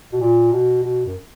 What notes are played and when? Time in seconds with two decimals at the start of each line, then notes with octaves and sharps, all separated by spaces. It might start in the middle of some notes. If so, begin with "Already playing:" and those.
0.13 B2
0.20 A#2
0.52 B2
0.83 B2
1.05 F#2